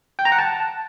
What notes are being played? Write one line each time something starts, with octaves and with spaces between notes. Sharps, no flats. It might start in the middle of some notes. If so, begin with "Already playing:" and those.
G5
A#5
F#5
A5